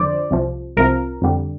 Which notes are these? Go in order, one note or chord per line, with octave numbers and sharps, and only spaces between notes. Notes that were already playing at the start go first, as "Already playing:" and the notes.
Already playing: F2 D3 F3 C5 D5
C2 C3 F3
C2 C3 F3 A#4
F2 D3 G3